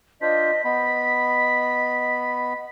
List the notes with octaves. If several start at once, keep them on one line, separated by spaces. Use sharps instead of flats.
D4 F4 C5 D#5 B6
B3 D#5 B5